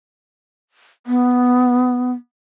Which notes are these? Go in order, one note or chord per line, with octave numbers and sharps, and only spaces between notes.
B3